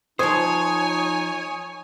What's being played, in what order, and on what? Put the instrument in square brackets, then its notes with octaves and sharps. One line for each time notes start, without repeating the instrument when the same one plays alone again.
[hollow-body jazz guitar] F3 C5 [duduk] D#4 [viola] C#5 G#5 [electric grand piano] D#6 G#6